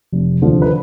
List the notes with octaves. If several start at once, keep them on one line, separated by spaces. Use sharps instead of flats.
F1
D#2 D3 F3
B4